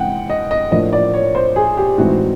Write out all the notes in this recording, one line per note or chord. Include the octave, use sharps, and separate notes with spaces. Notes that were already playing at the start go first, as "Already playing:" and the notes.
Already playing: C3 E3 G#3 F#5 G5
D#5
D#5
A2 F3 A#3 D4 D#5
D5
C#5
C5
G#4
G4
A2 E3 G#3 C4 D#4 F#4